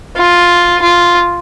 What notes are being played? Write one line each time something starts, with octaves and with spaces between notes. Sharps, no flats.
F4
F4